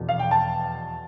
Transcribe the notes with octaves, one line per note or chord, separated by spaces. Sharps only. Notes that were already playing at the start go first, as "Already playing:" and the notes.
Already playing: F1 E2 B2
F5
G5
A5